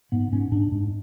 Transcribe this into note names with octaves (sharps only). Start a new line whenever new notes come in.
G#2 B3
G#2 C#4
G#2 D4
G#2